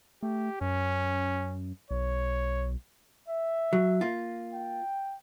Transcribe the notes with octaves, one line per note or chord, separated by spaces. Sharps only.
A3 G4
F#2 C#4
B1 C#5
E5
F#3
A#3 F4
G5